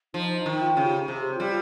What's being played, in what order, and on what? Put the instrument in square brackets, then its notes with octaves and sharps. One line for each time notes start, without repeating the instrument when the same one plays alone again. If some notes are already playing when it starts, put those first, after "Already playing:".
[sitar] F3 [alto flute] D#4
[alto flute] D#4
[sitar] D#3
[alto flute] F4
[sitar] C#3
[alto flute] G4
[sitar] C3 [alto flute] G#4
[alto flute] G4
[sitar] G3 [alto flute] F4